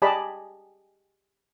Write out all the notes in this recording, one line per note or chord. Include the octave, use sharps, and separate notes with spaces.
G4 G#4 D5 D#5 A5 B5